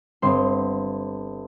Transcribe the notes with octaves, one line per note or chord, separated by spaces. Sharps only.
G1 C4 C6